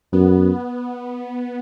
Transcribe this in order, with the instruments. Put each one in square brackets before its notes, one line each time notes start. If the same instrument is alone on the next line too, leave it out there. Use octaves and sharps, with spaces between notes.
[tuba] F#2 [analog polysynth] B3